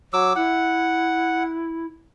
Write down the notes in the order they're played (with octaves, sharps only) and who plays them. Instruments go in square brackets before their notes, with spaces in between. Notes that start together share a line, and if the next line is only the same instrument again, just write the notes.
[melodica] F#3 D6 E6
[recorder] E4 [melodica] F#5